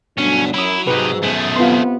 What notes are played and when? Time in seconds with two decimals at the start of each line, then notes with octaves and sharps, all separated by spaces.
0.18 D2 G2 B2 F#3 C#4 D4
0.54 F#2 F#3 E4 B5 D#6
0.87 G#2 C3 D#4 B4
1.23 F#2 B2 A3 G#4
1.56 C3 B3 F4 C6